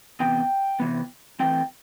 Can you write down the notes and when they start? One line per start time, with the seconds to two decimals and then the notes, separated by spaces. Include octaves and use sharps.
0.20 C3 E3 B3 G5
0.80 C3 E3 B3
1.40 E3 A3 C4 G5